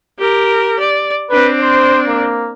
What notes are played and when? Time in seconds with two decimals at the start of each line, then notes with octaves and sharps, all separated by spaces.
0.19 G4 A#4
0.79 D5
1.31 C4 D4 B4
1.60 C5
2.07 A#3